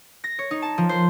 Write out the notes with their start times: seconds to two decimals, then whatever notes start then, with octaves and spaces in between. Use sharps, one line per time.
0.24 A#6
0.39 C#5
0.51 D#4
0.62 A5
0.78 F3
0.89 C5